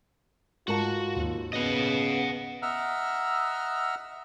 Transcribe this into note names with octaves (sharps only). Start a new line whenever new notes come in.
G#2 F4 F#4 A#4 A5
D#2
C#3 B3 D#5 F#5
D#5 E5 F#5 A#5 E6 F6